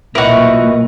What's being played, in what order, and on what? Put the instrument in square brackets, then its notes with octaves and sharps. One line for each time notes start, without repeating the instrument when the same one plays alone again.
[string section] B1 A#2 [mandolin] E4 F#4 [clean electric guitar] A#4 B4 D#5